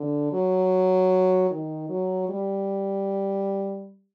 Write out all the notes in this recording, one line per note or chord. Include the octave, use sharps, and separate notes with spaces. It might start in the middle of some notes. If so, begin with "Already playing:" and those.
Already playing: D3
F#3
D#3
F#3
G3